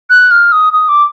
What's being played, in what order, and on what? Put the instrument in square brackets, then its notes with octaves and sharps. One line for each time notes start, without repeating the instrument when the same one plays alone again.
[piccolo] F#6
F6
D#6
D#6
D6